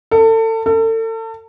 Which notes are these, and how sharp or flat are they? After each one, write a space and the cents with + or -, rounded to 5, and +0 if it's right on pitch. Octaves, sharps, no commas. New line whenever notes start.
A4 +30
A4 +35